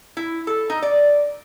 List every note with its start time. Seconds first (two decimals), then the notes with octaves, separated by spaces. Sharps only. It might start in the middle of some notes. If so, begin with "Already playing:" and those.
0.17 E4
0.47 A4
0.70 D#4
0.82 D5